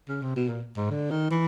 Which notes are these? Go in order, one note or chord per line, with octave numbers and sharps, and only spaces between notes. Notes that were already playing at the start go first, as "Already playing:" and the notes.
C#3
C3
B2
A#2
G#2
D3
D#3
E3